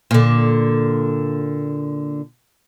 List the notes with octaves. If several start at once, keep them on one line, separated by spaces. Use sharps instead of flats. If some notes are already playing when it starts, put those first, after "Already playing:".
A#2 D3